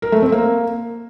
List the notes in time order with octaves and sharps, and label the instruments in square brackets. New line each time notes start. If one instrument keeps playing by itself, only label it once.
[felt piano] A#4
A3
C4
A#3